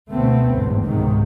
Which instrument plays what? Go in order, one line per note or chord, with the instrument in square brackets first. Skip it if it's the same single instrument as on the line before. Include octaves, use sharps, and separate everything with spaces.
[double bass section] D2 B2 A3 B3 C4
G1 E2 G#2
C#2 G#2 C3 D#3